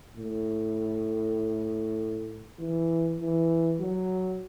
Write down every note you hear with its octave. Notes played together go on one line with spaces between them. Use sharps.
A2
E3
E3
F#3